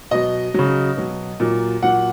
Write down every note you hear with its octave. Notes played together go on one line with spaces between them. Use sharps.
B2 F#3 D#5
C#3 F#3
B2 F#3
A#2 F#3
A#2 F#3 F#5